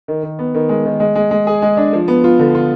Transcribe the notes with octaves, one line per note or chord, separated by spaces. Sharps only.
D#3
D#3
B3
D#3
G#3
D#3
G#3
G#3
G#3
G#4
G#3
D4
F3
B3
F4
D3
F4